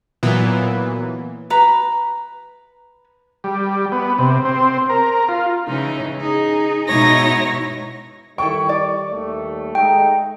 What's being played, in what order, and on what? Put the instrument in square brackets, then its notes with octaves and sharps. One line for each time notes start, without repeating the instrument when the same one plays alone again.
[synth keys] A#2 E3 F#3 B3
[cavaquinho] B4 A#5 B5
[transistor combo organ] G3
B3
C3
C4
A#4
F4
[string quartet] C#3 E3 D#4
D#4 G#4
B2 G#3 D#4 E4 C#5 A#6
[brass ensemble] D#3 G3 [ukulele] E4 A4 G5 [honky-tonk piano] C#6
[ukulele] D5
[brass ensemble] D#2 G3 A3
[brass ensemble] G#3 A3 D#4 [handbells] G5